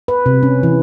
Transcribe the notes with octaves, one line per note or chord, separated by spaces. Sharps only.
B4
C3
C#4
E3